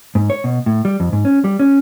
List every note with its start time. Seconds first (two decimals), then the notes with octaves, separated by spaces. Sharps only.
0.15 G#2
0.30 C#5
0.44 B2
0.66 A2
0.85 G3
1.00 F2
1.13 G#2
1.25 C#4
1.44 G3
1.60 C#4